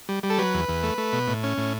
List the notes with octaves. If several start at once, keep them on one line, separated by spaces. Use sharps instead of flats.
G3
G3
A4
F#3 B4
E2
E2
A3
A3
B2
A2
C#4
A2